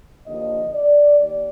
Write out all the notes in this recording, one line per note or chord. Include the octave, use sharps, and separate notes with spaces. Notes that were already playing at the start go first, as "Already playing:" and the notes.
D#2 D3 F3 A#3 D#5
D5
D#2 D5